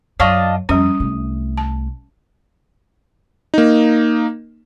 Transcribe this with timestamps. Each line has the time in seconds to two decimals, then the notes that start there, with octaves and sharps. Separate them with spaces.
0.20 F#2 D4 F4 C#5 D#5 C#6
0.69 F2 G3 C#4 D#6
1.00 C2 A3
1.57 A5
3.54 A#3 D#4